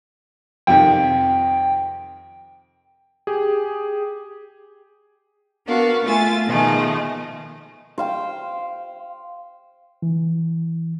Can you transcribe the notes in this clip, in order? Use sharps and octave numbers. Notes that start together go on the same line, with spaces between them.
F2 C3 D#3 G5
G4 G#4
B3 D4 F#4 A#4 F5
A3 F4 E5 G#5 A6
B2 D#3 F3 G#3 A3
C5 F5 G5
E3